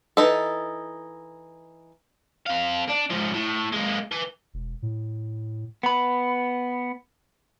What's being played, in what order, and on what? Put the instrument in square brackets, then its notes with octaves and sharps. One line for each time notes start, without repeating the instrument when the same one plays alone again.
[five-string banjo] E3 D#4 A4
[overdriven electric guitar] C4 F5
D4
G#2 F3
A2
G#3 A#3
B4 G#5
[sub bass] E1
A2
[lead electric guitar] B3 B5